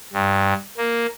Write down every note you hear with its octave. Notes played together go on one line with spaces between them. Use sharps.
G2
A#3